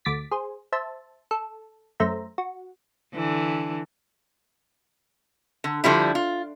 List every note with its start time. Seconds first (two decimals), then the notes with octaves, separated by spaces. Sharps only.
0.05 D2 D6 A6 B6
0.31 G#4 C5
0.72 C5 E5 A5
1.31 A4
2.00 F#2 A3 C5 E5 A#5
2.38 F#4
3.14 D3 E3
5.64 D3
5.84 D3 F3 G3 E4
6.15 F4